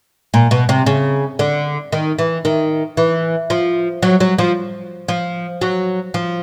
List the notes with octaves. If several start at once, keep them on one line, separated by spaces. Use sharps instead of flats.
A#2
B2
C3
C#3
D3
D#3
E3
D#3
E3
F3
F#3
F#3
F3
F3
F#3
F3